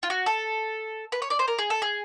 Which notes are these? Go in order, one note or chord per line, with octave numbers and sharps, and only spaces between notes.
F4
F#4
A4
B4
C#5
D5
C5
A#4
G#4
A4
G#4